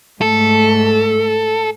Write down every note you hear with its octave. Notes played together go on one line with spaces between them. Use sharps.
G#2 A3 A4